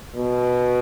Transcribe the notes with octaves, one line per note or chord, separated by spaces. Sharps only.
B2